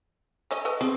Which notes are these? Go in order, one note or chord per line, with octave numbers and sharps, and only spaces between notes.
A3 C#4 D#5
A4 B4 D#5
C4 G#4